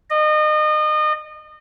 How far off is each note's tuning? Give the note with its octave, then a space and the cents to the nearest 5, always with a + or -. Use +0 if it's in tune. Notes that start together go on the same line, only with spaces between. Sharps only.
D#5 -30